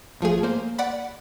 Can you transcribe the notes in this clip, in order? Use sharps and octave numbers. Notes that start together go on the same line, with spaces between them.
G#1 F3 A3 G#4
A#3 C5
D5 F#5 B5